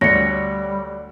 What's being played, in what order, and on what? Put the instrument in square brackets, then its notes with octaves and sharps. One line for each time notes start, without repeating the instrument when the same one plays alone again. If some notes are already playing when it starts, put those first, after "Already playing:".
[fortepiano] D2 C#5 [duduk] G3 [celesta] A#6 C#7